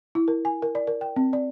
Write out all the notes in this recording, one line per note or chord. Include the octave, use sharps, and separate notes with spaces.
E4
A#4
G#5
A#4
D5
A#4
G5
C4
D5